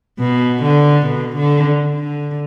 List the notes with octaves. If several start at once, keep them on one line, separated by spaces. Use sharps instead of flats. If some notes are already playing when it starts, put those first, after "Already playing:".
B2
D3
B2
D3
D3